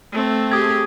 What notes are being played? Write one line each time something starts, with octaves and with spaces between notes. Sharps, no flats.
A3 C4
G4 G#4 D#6 G#6